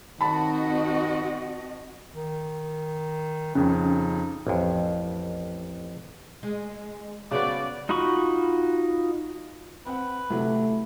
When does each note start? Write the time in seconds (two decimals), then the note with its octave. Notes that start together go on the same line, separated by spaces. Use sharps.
0.21 D#3 C4 F#4 D#5 A5 B5
2.14 D#3
3.55 F2 C#3 C#4 D#4
4.47 A1 F2
6.43 G#3
7.31 C#3 F#3 B3 F#4 D5
7.89 D#4 F4 F#4 B5 C#6
9.86 C4 B4 F#5
10.30 A2 C3 F#3 A3